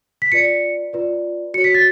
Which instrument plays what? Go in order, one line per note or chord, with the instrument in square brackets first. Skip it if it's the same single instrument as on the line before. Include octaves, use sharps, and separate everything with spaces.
[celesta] B6
F4 B4 D5 C#7
F4 B4 D5
F#4 C#5 C#7
B6
A6